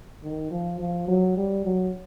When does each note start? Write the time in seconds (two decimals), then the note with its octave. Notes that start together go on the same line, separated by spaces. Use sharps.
0.23 D#3
0.51 F3
0.79 F3
1.08 F#3
1.37 G3
1.65 F#3